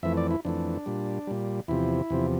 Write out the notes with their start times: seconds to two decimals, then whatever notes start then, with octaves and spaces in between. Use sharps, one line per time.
0.03 F2 E3 A3 E5
0.17 D5
0.31 E4
0.45 F2 E3 A3 D4
0.86 A#2 G3
1.27 A#2 G3
1.68 E2 C3 F3 E4
2.10 E2 C3 F3